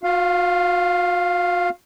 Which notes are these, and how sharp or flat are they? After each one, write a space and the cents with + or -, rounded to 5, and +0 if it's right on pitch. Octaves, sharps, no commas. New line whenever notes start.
F#4 -45 F5 +0